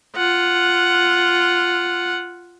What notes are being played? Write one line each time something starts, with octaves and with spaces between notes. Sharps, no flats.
F4 F#5